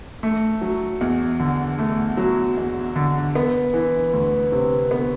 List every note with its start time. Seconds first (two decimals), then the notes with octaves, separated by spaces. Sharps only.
0.23 A3
0.61 F#3
1.01 E2
1.40 D3
1.79 A3
2.17 F#3
2.57 E2
2.96 D3
3.35 B3
3.74 E3
4.13 D2
4.52 C3
4.91 B3